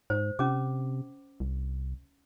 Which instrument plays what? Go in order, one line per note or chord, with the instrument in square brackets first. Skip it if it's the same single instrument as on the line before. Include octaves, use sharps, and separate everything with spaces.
[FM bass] G#2 [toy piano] C5
[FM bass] C3 [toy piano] C#4 D6
[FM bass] C2